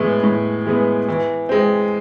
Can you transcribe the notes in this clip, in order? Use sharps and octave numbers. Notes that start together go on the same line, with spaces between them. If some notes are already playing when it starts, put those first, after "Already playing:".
Already playing: A2 E3 G#3 B3
A2
E3 G#3 B3
E3
G#3 C4